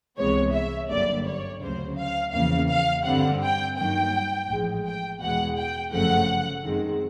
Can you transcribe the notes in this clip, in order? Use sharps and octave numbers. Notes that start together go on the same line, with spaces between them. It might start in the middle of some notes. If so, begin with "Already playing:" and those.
C2 C3 E3 G#3 B3 C#5
E5
G1 F#2 D3 G3 A#3 D5
C#5
D2 C#3 F#3 C5
F5
E2 C#3 F3 A#3 F5
F5
G2 D3 G3 C4 F#5
G5
G2 D#3 F#3 A#3 G5
A1 A2 F3 G#3
G5
E2 B2 G#3 F#5
G5
G1 F#2 C#3 F3 A3 F#5
F#2 D#3 G#3 C4